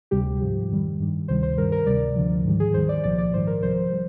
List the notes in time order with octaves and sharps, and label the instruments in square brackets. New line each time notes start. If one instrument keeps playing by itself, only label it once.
[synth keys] D2 C3 G3 G4
G#2 F3
F2 D#3 G3
G2 D#3 G3
D2 C3 D#3 G3 C5
C5
G2 D#3 G3 A#4
A#4
D2 C3 G3 D5
D2 D3 F3
G#2 D#3 G3
G#4
D#2 D#3 G3 C5
D5
C2 A#2 F3 D5
D5
G#2 D#3 G3 C5
A#4
C2 C3 F3 C5
G3